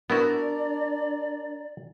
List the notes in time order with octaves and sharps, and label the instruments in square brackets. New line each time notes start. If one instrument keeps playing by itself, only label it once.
[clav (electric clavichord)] B3 E4 F#4 [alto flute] D4 [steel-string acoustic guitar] A#4 [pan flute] D5